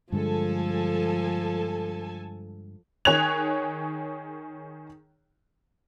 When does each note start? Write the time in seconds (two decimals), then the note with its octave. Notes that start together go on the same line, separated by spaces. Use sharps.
0.12 G2 D3 F3 G#3 A4 G#5 A5
3.05 D#3 G#4 C#5 F#6 G#6 F7